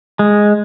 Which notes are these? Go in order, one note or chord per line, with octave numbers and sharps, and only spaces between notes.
G#3